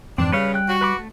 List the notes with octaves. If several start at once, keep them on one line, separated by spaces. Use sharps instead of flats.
F2 G#2 E3 C4 D4
C#3 G3 B4 C#5 F5
G5 F#6
F#4
B4 B5 D6
A3